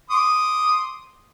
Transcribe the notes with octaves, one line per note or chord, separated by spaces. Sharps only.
C6 D6 D#6